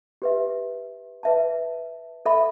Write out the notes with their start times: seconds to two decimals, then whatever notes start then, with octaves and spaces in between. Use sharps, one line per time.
0.22 G4 B4 E5
1.23 B4 E5 A5
2.26 A4 E5 B5